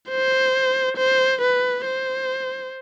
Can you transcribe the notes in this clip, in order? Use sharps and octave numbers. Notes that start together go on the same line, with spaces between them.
C5
C5
B4
C5